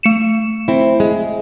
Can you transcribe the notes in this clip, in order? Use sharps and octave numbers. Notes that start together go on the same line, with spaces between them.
A3 C#7 E7
C4 E4
G#3